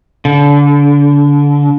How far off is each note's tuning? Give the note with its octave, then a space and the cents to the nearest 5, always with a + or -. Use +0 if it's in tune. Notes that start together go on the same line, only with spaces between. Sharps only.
D3 -30